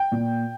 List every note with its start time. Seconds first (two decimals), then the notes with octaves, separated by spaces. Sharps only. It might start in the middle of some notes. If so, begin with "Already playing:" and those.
Already playing: G5
0.12 A#2